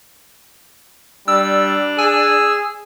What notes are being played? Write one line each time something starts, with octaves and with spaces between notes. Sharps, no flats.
G3 D4 E6
G#4 G#5 E6